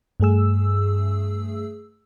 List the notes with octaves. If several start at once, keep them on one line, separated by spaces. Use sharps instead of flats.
G2 A3 G#4 E6